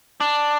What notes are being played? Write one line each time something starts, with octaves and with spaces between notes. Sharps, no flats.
D4